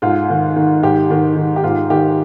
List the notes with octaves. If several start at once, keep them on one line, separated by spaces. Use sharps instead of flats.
G#2 F4
D#3
D#3
G#2 G4
D#3
D#3
G4
G#2 F4
D#3 G4